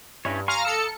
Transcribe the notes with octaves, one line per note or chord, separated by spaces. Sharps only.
G2 C#4 E4 C#5
F5 G#5 A#5 C6 C#6 F6
A4 D#6 E6 C#7